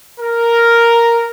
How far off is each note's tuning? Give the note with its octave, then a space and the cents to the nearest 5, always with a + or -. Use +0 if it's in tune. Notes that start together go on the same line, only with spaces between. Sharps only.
A#4 +0